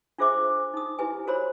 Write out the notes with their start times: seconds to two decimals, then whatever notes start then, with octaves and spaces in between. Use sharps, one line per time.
0.18 D4 F4 G#4 C5 E5 D6
0.74 D#4 D#6
0.99 E4 G4 B4 G#5
1.27 F#4 A#4 C5 C#5 B5 C6